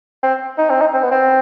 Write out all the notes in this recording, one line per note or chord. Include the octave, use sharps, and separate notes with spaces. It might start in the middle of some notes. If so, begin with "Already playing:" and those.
C4
D#4
C4
D#4
C4
B3
C4